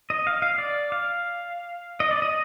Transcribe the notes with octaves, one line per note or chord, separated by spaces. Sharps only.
D#5
F5
F5
D5
F5
D#5
D5
D#5